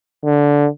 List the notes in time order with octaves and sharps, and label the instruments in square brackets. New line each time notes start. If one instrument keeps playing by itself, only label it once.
[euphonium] D3